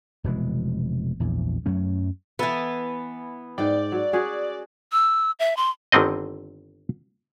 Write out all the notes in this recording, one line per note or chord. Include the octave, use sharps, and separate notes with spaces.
F1 B2 E3 G#3
A#1 E2
F#2 F#3 A3 C#4
E3 B3 A4
G#2 D5 G5
F#3
C#4 F#4 G#4
E6
E5
C6
G1 D3 D#3 C4 D#5